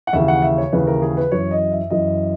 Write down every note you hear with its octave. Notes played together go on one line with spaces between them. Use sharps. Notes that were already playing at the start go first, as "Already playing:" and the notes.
F#5
D#2 C#3 E3 E5
F#5
E5
C#5
D#2 C#3 E3 B4
A#4
G#4
B4
F#2 E3 C#5
D#5
E5
F#2 E3 D#5